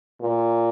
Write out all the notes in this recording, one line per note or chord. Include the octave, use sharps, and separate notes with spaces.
A#2